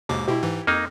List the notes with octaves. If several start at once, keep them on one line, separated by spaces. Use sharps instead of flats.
D#2 G#2 B2 D6
B2 E4 G4
G#2 E3
F2 A#3 D#4